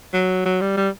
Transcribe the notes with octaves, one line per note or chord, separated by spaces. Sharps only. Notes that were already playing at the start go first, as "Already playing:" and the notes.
F#3
F#3
G3
G3